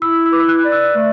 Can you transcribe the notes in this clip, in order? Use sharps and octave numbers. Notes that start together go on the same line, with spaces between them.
E4 E6
E6
B4 D6
E6
F#6
D5
E6
A3